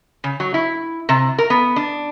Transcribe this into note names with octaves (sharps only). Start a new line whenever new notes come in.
C#3
F#3
E4
C3
A#4
B3
D4